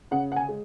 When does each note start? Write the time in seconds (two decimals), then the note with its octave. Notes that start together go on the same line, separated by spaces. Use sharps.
0.11 C#3 F#5
0.32 F#5
0.36 G#5
0.49 G#3